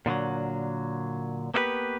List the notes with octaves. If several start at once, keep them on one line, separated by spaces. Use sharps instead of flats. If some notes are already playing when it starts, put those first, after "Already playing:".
A#2 D3 F3 F#3
A#3 B3 E4 G4 B4